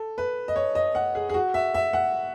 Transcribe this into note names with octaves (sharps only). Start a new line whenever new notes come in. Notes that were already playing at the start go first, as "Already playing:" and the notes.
Already playing: A4
B4
D#5
C#5
D#5
F#5
G#4
G#4
F#4
E5
E5
F#5